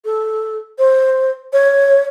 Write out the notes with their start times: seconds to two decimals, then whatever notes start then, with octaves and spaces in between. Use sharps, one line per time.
0.05 A4
0.78 C5
1.53 C#5